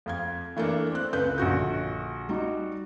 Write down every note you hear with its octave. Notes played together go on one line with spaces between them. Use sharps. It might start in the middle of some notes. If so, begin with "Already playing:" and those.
F2 F5 G#6
E3 A3 A#3 D4
C4 F#6
C#2 A3 B4 G6
A#1 D3 F#4 G6
G3 D#4 F#4